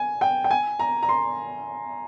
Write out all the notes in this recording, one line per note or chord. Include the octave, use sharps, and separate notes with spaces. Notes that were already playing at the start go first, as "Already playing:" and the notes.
Already playing: G#5
G5
G5
G#5
A#5
A#5
C6